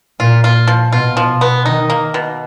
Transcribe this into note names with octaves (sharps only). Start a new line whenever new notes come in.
A#2 F4
F4
F3
B2 F4
F3
B3
D#3 D#4
A#3
B2